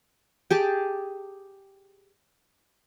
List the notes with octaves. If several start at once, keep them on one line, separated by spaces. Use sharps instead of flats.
G4 G#4 A5 D6